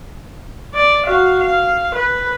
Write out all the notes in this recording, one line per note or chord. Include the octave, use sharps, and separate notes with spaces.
D5
F#4 F5
F5
B4